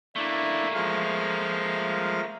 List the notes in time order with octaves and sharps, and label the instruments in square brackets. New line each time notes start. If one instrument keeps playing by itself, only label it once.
[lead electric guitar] A3 A#3 [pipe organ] D4 E4
[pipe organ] F3 G#3 F5